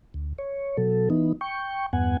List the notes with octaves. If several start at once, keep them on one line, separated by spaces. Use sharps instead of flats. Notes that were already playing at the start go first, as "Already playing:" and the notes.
D2
C#5
B2 F#3 A4
E3 B3 D#4
G5 C#6
E2 G2 B3 F#5 G#5